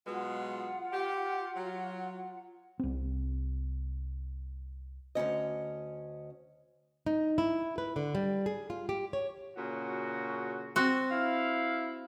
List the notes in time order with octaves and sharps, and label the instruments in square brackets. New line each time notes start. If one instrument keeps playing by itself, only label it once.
[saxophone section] B2 F#3 G#3 [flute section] F4 F#5
[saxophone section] G4
F#3
[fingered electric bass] C2 C4
[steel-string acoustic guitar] D2 G#2 C#4 D#5
[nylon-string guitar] D#4
E4
B4
D3
G3
G#4
F4
G4
C#5
[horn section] A#2 C#3 F#4
[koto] C4 F#4
[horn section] E4 F5